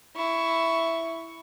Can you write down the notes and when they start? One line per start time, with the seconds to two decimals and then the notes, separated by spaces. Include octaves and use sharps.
0.16 E4 C#6